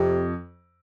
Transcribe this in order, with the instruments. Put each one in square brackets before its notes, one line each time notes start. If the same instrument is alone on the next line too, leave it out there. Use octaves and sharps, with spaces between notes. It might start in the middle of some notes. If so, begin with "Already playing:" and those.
Already playing: [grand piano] F2 [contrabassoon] C3